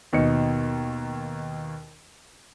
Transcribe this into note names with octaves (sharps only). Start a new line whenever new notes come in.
D#2 B2 D#4 C#7